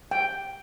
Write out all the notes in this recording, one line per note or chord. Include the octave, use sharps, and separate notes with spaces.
G5